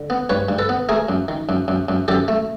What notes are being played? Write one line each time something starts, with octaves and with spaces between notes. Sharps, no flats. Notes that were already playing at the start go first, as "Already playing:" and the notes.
Already playing: D3
B3
G2 B4 C#5
G2
A4 B4
B3
A3 G#4 A#4
F#2
D#3
F#2
F#2
F#2
F#2 G4 A4
A3